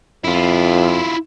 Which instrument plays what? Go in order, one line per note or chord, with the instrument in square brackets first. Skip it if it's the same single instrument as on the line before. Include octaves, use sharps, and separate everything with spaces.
[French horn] F2 [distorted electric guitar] E4 F4